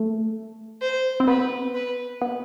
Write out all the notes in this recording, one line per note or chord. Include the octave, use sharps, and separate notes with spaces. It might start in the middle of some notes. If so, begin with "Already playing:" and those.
Already playing: A3
C5
C4
B3 B4
B4
B3